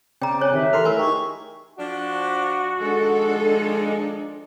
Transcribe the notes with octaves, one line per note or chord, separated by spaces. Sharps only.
C#3 C4 D5 G5 A#5
C#5 G#5 F#6
D#3 G4 E5
E3 A4 A#4 C6 F6
A3 E4 A#4 G#5
D#4 G4 G#4 C#6
F3 D4 F#4
D#3 F3 G#3 D4 A4